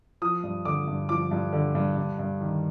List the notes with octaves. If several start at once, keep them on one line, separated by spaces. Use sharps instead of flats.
F3 D#6
G2
D3 D6
G2
F3 D6
G2
D3
G2
G2
G2
D#3